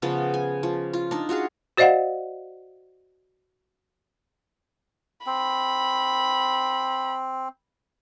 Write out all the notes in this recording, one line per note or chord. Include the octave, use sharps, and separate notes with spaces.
C#3 F3 B3 C#4
G#5
F3
F4
D4 D#4
F4 F#4 G#4 F5
F#4 C5 D5 D#5 F5 F#5
C4 B5